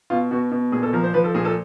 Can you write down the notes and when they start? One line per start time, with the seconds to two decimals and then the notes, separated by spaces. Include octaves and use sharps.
0.10 B2 F4
0.31 B2 F#4
0.51 B2
0.72 A#2 G#4
0.83 A4
0.93 F3 A#4
1.04 C5
1.14 F3 B4
1.24 A4
1.35 A#2 G#4
1.45 A4